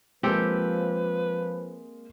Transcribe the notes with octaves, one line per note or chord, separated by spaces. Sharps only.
F3 G#3 A#3 C4 G4 A4 B4